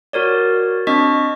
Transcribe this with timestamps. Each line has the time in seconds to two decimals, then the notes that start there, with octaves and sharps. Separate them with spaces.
0.13 F#4 A#4 C#5 D5
0.87 C4 D4 D#5 C#6 B6